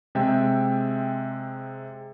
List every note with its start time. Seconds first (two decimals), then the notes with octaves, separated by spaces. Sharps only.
0.15 C3 G#3 E5 G5